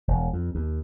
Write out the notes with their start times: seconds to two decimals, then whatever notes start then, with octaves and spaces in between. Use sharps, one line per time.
0.08 E1
0.33 F2
0.55 D#2